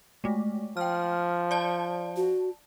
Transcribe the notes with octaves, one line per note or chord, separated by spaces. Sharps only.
G#3 A3
F3 G5 F6
D5 A5
F#4